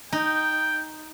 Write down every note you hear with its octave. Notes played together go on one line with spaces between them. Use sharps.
D#4 G5